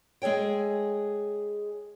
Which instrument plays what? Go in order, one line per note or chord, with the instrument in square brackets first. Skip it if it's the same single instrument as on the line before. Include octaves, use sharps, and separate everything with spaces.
[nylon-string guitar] G#3 G#4 A4 C#5 G5